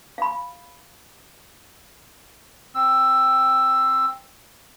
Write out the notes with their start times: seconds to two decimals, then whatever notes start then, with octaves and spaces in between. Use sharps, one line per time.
0.18 F5 B5
2.75 C4 E6